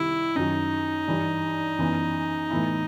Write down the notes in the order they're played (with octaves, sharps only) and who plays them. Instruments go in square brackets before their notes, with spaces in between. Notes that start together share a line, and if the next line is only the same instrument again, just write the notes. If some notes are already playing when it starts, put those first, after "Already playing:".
Already playing: [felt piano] C3 D#3 G3 [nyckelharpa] E4
[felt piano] F#2 D#3 F#3 [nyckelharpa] D#4
[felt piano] G2 E3 G3
F#2 E3 B3
A2 E3 B3 E4